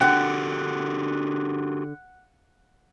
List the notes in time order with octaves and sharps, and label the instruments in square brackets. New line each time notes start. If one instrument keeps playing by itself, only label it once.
[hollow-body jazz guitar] D3 G5 [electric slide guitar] D4 F#4 G4 [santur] F#5